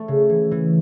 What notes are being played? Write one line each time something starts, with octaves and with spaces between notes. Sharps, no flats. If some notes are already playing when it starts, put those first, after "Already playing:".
Already playing: A3
C#3
E3
E3